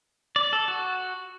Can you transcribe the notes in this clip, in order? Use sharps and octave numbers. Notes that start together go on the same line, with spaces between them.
D5
A4
F#4